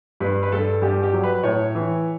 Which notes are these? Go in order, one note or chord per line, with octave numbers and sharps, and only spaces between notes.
G2 B4
B4
G2 A4
G2 G4
G4
F#3
B4
A2 C#5
E3